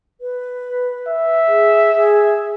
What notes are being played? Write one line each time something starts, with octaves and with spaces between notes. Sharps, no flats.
B4
E5
G#4
G#4